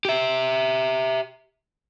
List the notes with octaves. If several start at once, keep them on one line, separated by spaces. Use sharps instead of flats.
G4 E5